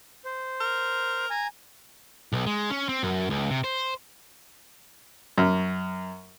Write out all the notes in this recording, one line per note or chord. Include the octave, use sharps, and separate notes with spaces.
C5
A#4
G#5 A#5
B1
G#3
C#4
C4
F#2
C#2
C3
C5
F#2